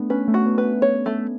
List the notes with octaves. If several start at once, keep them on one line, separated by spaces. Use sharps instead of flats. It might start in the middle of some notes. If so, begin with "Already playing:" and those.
Already playing: A3 B3 D4
C#4 B4
A3
F#4
B3
B4
B3
C#5
A3